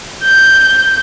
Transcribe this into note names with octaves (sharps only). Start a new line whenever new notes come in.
G6